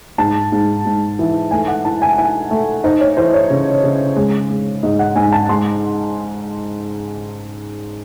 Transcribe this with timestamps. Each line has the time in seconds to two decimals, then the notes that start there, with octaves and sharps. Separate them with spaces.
0.18 G#2 A5
0.52 G#2
0.85 G#2
1.19 E3
1.51 A3 G#5
1.68 F#5
1.85 E4 A5
2.02 G#5
2.18 E4 G#5
2.51 A3
2.84 D#4 C5
3.01 C#5
3.17 E3 C5
3.34 C#5
3.50 C#3
3.83 C#3
4.16 G#3
4.50 G#3
4.83 G#2 D#5
4.99 F#5
5.16 G#2 G#5
5.32 A5
5.49 G#3 C6